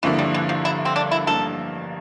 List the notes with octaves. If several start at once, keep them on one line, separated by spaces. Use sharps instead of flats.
G2 D3 E3 F3 A#3 E4
G3
E3
F3
E4
C4
D4
E4
A1 G2 F3 A#3 A4